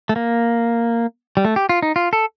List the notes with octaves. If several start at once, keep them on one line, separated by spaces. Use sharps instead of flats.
A3
A#3
G3
A3
G4
F4
D#4
F4
A4